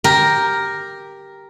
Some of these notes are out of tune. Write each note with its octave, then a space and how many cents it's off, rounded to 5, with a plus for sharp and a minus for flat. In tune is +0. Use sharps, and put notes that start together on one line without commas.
G4 +0 A#4 +0